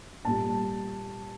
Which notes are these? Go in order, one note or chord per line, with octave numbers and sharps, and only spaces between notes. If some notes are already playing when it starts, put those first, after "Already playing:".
A#2 G3 A5